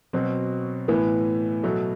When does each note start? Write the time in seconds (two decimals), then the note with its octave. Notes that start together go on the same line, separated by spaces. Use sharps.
0.13 B2 F#3 C4
0.88 A2 E3 B3
1.63 B2 F#3 A3